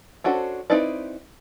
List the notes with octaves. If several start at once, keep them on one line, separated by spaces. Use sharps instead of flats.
C#4 D4 F#4 A4 C5
C4 D#4 E4 B4 D5